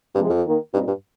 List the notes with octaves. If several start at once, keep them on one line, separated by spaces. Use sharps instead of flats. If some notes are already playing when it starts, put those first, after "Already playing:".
G2 C3 F3 G#3
F2
D#3 A#3 D#4 A#4
G2 A#2 G3 C4 D#4
G2